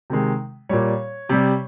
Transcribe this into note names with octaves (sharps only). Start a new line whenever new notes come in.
C3 D#3 G#3
A#2 G3 C#5
C3 G3